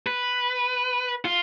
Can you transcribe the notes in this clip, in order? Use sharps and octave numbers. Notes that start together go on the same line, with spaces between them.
B4
F4